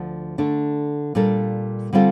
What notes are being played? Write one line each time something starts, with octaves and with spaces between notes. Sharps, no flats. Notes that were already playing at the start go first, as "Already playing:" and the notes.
Already playing: D2 D3 F3
D3 A3 D4
A#2 G3 A#3 D4 A4
D3 G3 C4 F4 A4